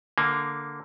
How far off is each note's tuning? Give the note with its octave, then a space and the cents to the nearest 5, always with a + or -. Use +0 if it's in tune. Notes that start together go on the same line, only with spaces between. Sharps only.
D3 +0 A#3 +0